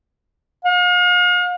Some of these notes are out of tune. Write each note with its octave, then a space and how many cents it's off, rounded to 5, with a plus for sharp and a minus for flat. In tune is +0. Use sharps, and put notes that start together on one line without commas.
F5 +40